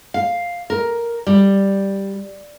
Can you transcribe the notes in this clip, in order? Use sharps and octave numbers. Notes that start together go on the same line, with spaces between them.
F5
A#4
G3